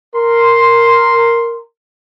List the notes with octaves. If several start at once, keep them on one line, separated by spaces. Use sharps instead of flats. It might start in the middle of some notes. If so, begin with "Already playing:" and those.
A#4 C6